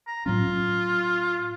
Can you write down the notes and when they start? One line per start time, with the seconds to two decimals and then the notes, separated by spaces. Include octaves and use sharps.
0.07 A#5
0.26 A2 F#3 C#4 F4